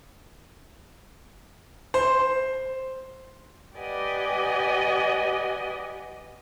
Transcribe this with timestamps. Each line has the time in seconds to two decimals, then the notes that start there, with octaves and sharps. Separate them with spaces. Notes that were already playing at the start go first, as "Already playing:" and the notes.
1.94 C5
3.76 G4 B4 D5 D#5 F#5 G#5